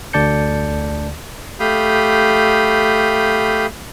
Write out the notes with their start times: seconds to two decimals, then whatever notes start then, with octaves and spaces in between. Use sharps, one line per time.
0.13 D2 D3 D5 A5 G6 C#7
1.60 A3 G4 F5 B5 D#6 G6